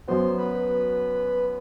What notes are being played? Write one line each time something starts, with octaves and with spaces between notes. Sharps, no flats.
F#2 F#3 B3 F#4 C5
B4